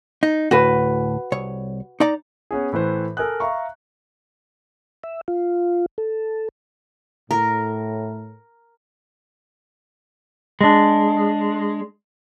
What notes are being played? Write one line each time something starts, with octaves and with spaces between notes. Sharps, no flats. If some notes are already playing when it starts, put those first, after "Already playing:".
D#4
D2 A2 F#4 B4
C2 C#5
D#4 D5 A#5
B3 C#4 G#4
A2 E3 B4 C5
A4 A#4 G#5 D#6 F#6
E5 F5 A#5 C#6
E5
F4
A4
A2 A#4
G#3 D4